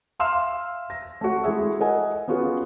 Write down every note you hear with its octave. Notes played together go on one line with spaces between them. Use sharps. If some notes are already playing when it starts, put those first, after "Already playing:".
E5 F5 C6 E6 F6 E7
A#6
A3 F#4
G#3 E4 G#4 E5
A#4 D#5 F#5 G#5
B3 C#4 F4 F#4 G#4